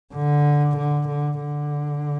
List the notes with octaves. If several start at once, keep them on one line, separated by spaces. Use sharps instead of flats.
D3
D3
D3
D3